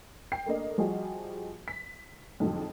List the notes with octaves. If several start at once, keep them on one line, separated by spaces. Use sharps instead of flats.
G5 C7
A3 A#3 D4 D#5
F3 G3 F#4 G#4 D#5
B6
F2 G#2 D3 F#3 A3